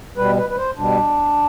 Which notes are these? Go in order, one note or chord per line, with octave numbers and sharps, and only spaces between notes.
B2 G3 B4
B4
B4
C5
B2 G3 D4